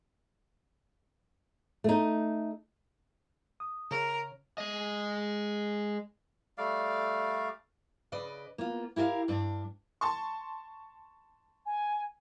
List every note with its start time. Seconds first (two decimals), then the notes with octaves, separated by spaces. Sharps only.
1.84 A3 D#4
3.60 D#6
3.91 C#3 A#4 C#5
4.58 G#3 D#5
6.58 G3 A3 D5 F5
8.12 C#3 B4 D5 D#5
8.58 A#3 B3 F4
8.96 E4 G4 A#4 D#5 F5
9.28 G2 D4
10.01 A5 C6 C#6
11.66 G#5